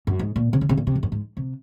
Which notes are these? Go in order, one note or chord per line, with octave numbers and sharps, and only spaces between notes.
F#2
G#2
A#2
C3
C#3
C3
A#2
C3
F2
F#2
G#2
C3